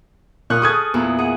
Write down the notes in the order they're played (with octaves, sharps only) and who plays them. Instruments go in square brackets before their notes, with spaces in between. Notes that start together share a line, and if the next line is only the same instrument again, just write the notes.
[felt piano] A#2 F#6 [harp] C#6 D#6 F6
[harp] G#4 A4 [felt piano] D#6 F#6 G#6
[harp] E2 A#2 E4
G#4 F#5